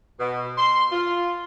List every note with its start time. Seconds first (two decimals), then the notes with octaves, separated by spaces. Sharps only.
0.18 B2
0.57 C6
0.91 F4